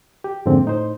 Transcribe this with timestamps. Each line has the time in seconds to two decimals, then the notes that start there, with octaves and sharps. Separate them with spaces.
0.24 G4
0.46 F2 G#2 D3 A#3 C4
0.65 A2 D#4 C5